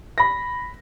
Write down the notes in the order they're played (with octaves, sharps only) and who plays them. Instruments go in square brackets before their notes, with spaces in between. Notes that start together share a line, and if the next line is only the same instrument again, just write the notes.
[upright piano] B5 A#6